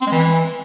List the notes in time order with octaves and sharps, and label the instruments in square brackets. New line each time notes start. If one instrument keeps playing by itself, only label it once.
[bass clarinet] C4
G#3
E3